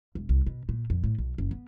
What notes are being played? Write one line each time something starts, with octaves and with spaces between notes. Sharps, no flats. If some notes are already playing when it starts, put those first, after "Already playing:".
E1
C2
B2
A#2
F2
A2
B1
F#1
B3